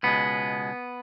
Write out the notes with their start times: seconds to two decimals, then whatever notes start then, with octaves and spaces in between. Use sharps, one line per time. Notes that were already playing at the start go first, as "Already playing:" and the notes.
0.03 C#2 B2 G#3 B3